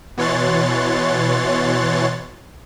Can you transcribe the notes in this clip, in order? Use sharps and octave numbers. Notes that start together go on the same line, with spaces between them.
B2 E3 C#5 C6 F#6 A6